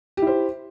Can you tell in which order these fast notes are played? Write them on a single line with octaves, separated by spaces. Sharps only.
G4 E4 C5